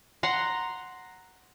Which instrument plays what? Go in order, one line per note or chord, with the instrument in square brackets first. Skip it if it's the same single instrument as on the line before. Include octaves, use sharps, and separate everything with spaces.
[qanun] F#5 A#5 C6